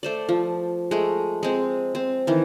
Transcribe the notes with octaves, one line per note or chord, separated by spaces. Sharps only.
A3 C5 D5
F3
G#3 A3
G#3 C4
C4
D#3 E3